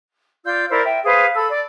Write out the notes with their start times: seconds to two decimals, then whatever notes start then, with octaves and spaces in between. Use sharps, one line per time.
0.44 F4 D5 E6 G6
0.70 E4 A#4 C5 D5
0.85 E5 G5
1.05 G#4 B4 C5 F5
1.35 A4 B5 E6
1.48 D5